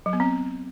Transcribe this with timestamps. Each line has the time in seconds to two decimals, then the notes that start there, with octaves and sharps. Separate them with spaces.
0.06 F#3
0.13 B3
0.20 C4